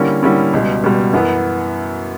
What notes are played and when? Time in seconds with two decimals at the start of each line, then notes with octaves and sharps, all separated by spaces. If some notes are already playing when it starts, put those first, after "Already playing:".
Already playing: D3 G3 A#3 C#4 E4
0.23 D3 G3 A#3 C#4 E4
0.53 C#2 B2 G3
0.83 C#2 B2 G3
1.13 F#2 E3 B3